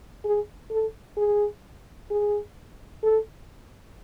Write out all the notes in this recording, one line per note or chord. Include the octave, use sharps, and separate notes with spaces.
G#4
A4
G#4
G#4
A4